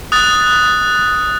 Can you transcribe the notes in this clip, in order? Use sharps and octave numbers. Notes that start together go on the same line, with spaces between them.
D#6 F#6 A6